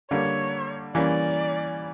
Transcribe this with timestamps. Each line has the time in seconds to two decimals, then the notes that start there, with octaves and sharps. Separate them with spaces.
0.11 D3 G3 A#3 C#5
0.95 E3 G3 A#3 C#4 D5